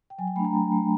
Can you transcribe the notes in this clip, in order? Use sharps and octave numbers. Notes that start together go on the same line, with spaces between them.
G5
F#3 G#5
G5
A3 D4 B5
A#5
F#3
A3 D4